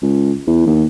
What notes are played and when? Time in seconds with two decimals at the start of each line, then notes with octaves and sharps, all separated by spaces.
0.02 C#2
0.47 E2
0.66 D#2